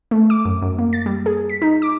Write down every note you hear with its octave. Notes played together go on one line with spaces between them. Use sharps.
A3
D6
F#2
F#2
A#3
A6
G3
G#4
B6
D#4
D6